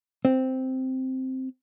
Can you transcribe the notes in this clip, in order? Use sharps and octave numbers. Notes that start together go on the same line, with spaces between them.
C4